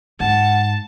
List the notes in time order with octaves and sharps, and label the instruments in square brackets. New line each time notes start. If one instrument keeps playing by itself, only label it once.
[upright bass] G#2 [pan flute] F#5 [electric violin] A5